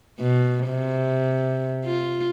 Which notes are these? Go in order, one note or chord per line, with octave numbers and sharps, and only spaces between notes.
B2
C3
F4